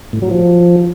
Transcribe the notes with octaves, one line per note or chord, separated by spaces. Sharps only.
A2
F#3
F3